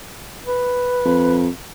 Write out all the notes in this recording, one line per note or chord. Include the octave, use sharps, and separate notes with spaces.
B4
F2